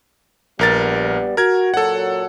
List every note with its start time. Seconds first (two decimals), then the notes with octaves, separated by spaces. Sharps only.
0.59 A#1 G3 B3 A#4 A6
1.37 F#4 A#4 G#6
1.74 A#2 F#3 A4 F#5